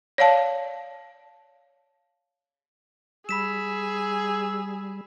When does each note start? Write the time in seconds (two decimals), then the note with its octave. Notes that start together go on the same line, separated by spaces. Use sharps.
0.18 C#5 D5 F5 A5
3.29 G3 G#4 B5 E6 B6 E7